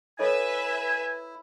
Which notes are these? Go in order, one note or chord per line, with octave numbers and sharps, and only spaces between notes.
E4 A4 B4 C#5 D#5 E5 G#5